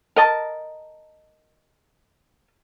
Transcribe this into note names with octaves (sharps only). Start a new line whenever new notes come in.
A#4 D#5 A5